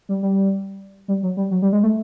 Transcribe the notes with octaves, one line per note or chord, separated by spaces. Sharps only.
G3
G3
G3
F#3
G3
F#3
G3
G#3
A3